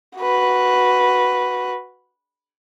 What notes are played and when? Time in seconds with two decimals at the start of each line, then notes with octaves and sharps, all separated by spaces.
0.18 F#4 B4